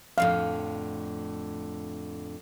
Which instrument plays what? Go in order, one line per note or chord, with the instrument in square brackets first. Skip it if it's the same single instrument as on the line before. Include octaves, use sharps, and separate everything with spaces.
[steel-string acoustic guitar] F2 A2 D3 [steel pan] F5